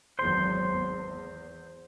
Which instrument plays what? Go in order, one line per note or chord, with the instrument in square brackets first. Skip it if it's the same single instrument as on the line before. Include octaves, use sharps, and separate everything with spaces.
[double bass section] G#1 E2 F#3 [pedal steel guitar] C5 C6
[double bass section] E2